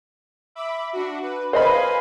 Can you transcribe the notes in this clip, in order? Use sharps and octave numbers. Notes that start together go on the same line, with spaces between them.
E5 B5 D6
D4 F#4
B4
B4 C5 D#5 F5 G#5 B5